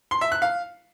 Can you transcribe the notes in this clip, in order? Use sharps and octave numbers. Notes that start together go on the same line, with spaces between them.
C6
E5
F#6
F5